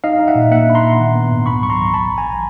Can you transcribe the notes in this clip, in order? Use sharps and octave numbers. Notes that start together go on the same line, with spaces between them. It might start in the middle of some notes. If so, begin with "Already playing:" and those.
D#4 D#5 F5
D#4
E5 F#5
A#2
A#3 E5 F#5
D4 B5
A#5 C6
A#2
D#3
B3
G#2
C#2 B5 C#6
F#3 C#6
A#5 C6
C#2
A1 A5 B5
A1
G#5 A#5